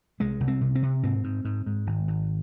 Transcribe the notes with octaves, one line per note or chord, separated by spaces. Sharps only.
C2 G#3
C2
C4
C3
C4
C3
G#2 C4
G#2
G#2
G#2
G#1
G#1